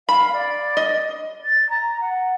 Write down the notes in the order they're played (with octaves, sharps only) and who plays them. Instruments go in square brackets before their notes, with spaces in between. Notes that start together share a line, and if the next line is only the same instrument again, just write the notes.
[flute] F5 [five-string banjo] B5
[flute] D5
[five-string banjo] D#5
[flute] A6
A#5
F#5